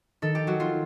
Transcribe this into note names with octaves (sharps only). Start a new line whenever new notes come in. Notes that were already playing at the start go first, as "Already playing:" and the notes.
D#3 A4
G4
F#3 F#4
F4